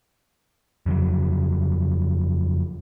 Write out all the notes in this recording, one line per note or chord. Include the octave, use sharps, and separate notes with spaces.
F2 C#3 F#3